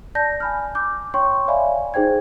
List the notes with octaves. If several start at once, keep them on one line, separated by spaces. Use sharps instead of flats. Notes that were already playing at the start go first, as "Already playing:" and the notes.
D5 A5 G6 A#6
G#5 B5 F6
D6 G6
C#5 G5 C6 C#6
C#5 D5 E5 F5 G#5 B5
D#4 G#4 C5 G5 G#6